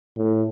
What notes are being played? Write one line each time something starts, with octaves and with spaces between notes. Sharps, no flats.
A2